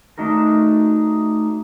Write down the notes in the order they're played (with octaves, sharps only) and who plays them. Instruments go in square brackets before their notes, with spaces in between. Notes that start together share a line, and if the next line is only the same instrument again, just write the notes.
[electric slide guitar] A3 D4 D#4 F#4 A#4